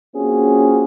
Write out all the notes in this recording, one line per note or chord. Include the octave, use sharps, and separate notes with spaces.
A#3 C4 C#4 F4 F#4 G#4